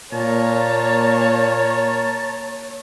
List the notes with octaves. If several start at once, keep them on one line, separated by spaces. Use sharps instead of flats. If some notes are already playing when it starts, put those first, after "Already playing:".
A#2 A#3 C#5 A5 A#5